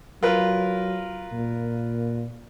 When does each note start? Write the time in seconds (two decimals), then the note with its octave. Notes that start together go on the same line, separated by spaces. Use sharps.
0.23 F#3 F4 A#4 B4
1.32 A#2